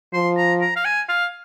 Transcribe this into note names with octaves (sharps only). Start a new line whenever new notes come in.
F3 C6
A#5
A#5
F5
G#5
F5